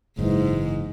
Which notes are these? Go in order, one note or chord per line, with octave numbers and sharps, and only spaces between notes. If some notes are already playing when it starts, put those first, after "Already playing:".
F#1 G#2 E3